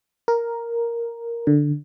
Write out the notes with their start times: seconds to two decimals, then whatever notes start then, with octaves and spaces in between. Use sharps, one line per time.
0.28 A#4
1.47 D3